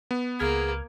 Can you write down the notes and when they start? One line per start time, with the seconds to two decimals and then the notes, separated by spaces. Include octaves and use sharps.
0.11 B3
0.40 C#2 A#3 G#4 F6 G#6